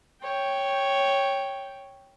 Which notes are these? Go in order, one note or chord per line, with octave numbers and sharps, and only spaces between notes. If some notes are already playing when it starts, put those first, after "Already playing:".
C#5 G5